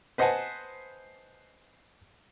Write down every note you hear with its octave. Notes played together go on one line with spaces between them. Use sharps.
B4 C5 D#5 F#5 G#5 A5